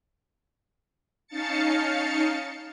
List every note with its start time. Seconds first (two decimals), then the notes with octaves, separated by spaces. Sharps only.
1.27 C#4 D#4 F5 A5 A6 C#7